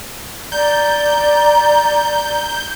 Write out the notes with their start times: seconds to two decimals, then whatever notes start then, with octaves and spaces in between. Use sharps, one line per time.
0.52 D5 A#5 G6